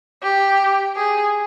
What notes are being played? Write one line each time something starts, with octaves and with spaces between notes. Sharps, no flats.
G4
G#4